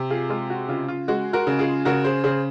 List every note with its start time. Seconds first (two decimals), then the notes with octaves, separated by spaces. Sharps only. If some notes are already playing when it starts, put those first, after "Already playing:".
Already playing: C3
0.10 F4 G#4
0.29 G#3 F4
0.50 F#4
0.68 C#3 F4
0.88 F4
1.08 G#3 F#4
1.33 F#4 A#4
1.47 C#3
1.59 F4 G#4
1.85 C#3 F#4 A#4
2.04 G#4 C5
2.24 C#3 G#4 C5